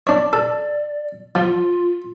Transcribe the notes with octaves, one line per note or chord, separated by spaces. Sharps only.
D4 C#5 D5
A4 D5
F3 F4